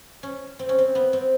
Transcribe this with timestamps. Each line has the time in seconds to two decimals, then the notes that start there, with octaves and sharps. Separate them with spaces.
0.23 C#4
0.59 C4
0.69 C#4
0.78 C4
0.95 B3
1.13 C4